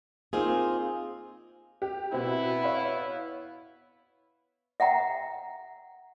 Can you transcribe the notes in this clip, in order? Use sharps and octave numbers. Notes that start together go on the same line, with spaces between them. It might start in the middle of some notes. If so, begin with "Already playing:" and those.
A#3 C4 D#4 F4 G#4
G4
B2 B3 C4 E4
C#5 F5 B5
E5 F#5 G5 A#5